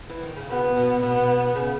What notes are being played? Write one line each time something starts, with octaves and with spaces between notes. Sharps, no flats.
E3
D#3
C#3
B2 B3
B2
B2 B3
C#3